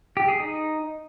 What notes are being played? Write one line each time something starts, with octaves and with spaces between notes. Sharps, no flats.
G4
G#4
D#4